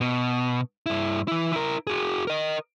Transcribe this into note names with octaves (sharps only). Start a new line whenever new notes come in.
B2
G2 E4
E3 E4
E4 A#4
F#4 G#4
A#4 D#5